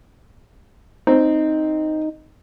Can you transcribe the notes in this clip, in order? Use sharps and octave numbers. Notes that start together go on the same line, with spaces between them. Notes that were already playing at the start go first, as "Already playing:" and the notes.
C4 D#4